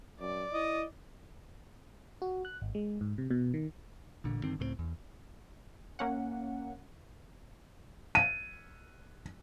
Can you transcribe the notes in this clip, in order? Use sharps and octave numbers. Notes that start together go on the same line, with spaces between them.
F#2 D5
E4 D#5
F#4
F#6
G#1
G#3
G#2
C3
B2
D#3
A1 A#2 D3
G2 D3 D#3 C4
C#2 A2 G#3 C4
E2
A#3 C#4 F#5
D#7